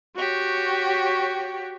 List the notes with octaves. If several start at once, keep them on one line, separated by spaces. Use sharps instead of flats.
F#4 G4 C#5